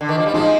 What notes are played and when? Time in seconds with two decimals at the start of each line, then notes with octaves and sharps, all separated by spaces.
0.01 D3
0.09 D#3
0.18 F3
0.26 G3
0.34 F3 G#3 D#4